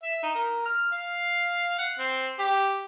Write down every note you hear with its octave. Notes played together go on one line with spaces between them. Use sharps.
E5
D#4
A#4
F6
F5
F#5
C4
G4